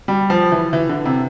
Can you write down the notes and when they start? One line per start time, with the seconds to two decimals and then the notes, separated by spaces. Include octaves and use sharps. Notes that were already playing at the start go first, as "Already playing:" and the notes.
0.08 G3
0.30 F3
0.52 E3
0.73 E3
0.89 D3
1.05 C3